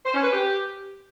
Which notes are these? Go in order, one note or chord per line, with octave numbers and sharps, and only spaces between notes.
C5
C#4
B4
G4